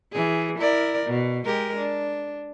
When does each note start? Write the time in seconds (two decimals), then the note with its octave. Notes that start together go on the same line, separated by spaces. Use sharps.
0.12 E3 G#4
0.58 E4 A#4 D5
1.06 B2
1.45 G#3 G4 A#4
1.76 D4